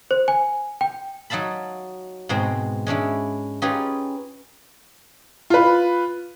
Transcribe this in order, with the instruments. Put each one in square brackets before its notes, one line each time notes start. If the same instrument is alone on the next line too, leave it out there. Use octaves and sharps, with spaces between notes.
[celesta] C5
G#5
G5
[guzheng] F#3 D#4 F5 A5 B5
G#2 B2 G#3 C4
G#3 C#4 D4 E4
C#4 D#4 F4 G4 G#4 B4
[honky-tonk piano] F4 B4